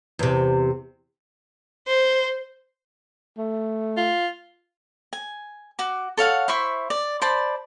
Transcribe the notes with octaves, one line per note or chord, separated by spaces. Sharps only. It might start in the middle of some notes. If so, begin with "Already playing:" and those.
E2 C3
C5
A3
F4
G#5
F#4 D6
A4 C#5 F5 F#5
E4 C5 E5 C#6
D5
C5 D5 A5 B5